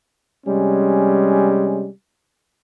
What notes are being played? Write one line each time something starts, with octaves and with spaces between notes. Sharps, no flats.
C3 G3 G#3 C#4